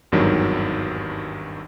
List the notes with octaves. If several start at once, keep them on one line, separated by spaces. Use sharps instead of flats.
G#1 E2 G2 D#3 F#3